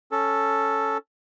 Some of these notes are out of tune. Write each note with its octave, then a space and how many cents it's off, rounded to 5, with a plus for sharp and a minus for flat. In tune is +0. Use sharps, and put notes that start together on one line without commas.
C#4 +0 A4 +0